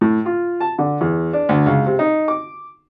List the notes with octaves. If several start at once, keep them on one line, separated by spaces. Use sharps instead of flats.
A2
F4
A5
D3
E2
D4
D2
C#2
C3
D#4
D6